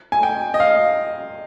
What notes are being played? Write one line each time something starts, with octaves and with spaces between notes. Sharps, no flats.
G#5
G5
D#5
F5